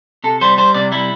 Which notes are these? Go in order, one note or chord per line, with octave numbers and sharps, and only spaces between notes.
C3 A4
G3 C5
G3 C5
C3 D5
G3 E4